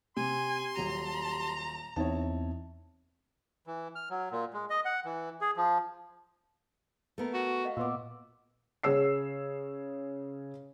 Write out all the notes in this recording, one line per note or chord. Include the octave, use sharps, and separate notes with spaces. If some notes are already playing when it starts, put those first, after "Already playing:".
C3 G4 G#5 C6
D#1 F#3 A#5 D#7
E2 C4 D#4 E4 C#5 A5
E3
F6
F#3
A#2
G#3
D#5
F#5
E3
G#4
F3
A3 B3 A#4
F#4
D#5 F5 F#5
A#2 B3 F4 D6 E6
C#3 G#4 C#5 E6 C7